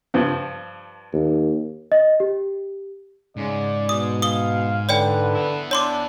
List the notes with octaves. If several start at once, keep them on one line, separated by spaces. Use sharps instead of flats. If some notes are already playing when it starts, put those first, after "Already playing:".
G2 F3
D#2
D#5
G4
G#2 C#3 D5
B2 D#6
F5 D#6 G7
D3 B4 C#5 D5 G5
B3 E4
D4 C#5 C6 D6